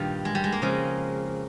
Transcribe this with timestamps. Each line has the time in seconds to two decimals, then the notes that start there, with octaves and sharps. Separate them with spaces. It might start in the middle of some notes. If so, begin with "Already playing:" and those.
Already playing: G2 A#2 D#3 G3 F4
0.25 G#3
0.35 G3
0.44 G#3
0.52 A#3
0.62 F2 C#3 F3 G#3